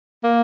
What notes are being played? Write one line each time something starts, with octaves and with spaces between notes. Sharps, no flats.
A#3